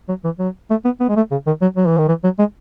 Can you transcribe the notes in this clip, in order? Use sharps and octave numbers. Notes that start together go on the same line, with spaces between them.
F#3
E3
F#3
A3
B3
B3
G#3
A3
C#3
D#3
F#3
F#3
E3
D#3
E3
F#3
G#3